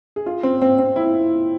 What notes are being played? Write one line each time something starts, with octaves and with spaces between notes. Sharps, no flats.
G#4
F4
C4
C4
C4
E4